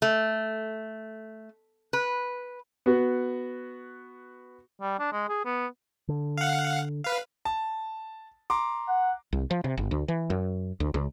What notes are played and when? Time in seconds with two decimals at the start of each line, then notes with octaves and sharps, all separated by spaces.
0.02 A3
1.93 B4
2.86 B3 F#4
4.81 G3
4.99 D4
5.12 G#3
5.29 G#4
5.45 B3
6.09 D3
6.38 F5 F#5
7.04 B4 F5
7.45 A5
8.50 A#5 C6 D6
8.88 F#5
9.33 C2
9.51 F3
9.64 C3
9.78 G1
9.91 D2
10.08 E3
10.30 F#2
10.80 D2
10.94 C#2